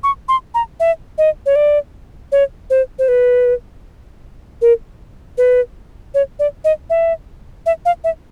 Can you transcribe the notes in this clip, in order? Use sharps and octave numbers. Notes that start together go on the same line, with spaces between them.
C#6
C6
A#5
E5
D#5
C#5
D5
C#5
C5
C5
B4
A#4
B4
C#5
D5
D#5
E5
E5
F5
E5